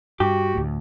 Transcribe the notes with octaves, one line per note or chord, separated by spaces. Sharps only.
G2 F#4 G4
D2 A2